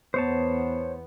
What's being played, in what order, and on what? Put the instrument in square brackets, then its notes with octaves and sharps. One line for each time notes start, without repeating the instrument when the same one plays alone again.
[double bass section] E2 B3 [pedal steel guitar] C5 C#5 A5